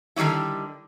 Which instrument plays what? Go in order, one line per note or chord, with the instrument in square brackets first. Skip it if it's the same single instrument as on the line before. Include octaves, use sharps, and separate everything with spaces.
[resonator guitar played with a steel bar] D3 D#3 G3 C#4 E4